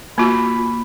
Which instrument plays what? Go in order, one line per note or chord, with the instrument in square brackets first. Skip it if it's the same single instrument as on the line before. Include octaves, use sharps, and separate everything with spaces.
[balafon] A#3 F4 F#4 [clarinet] B5